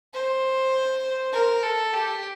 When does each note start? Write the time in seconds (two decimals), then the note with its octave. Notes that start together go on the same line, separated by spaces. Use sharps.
0.14 C5
1.33 A#4
1.63 A4
1.94 G4